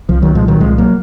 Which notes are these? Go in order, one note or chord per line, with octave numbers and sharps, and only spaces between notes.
C2 F3
D#3 F#3
A#2 F3 G#3
D#3 F#3
C2 F3 G#3
F#3 A#3